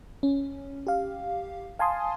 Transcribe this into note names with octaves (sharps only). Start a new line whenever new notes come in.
C#4
G4 F5
F5 G#5 A5 C6 D#6